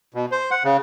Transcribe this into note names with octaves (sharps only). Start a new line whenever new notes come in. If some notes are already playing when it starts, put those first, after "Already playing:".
B2
C5
F#5
C#3